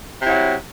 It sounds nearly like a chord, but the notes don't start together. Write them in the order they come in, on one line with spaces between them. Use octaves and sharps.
C3 E4 F#3